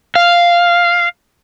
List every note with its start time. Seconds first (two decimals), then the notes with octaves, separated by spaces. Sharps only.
0.16 F5